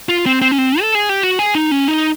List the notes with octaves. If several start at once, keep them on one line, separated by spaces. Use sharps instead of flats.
F4
C4
C4
C#4
C4
A4
G#4
G4
F#4
G#4
D#4
C#4
D#4